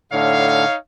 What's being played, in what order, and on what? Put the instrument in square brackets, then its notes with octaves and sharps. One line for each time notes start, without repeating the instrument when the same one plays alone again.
[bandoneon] A2 D3 [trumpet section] D#4 C#5 F5